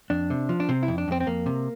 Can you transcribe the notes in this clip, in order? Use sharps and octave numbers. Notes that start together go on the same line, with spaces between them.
F2 D4
C3
F3
D4
C3 C4
E4
F2
D4
F2 C4
C4
F2 A#3
C3